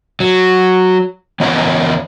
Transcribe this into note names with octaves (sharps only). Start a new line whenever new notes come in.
F#3
E3 B3 D4 F4 C#5 A#5